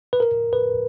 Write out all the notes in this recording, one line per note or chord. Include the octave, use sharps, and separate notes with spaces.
B4
A#4
B4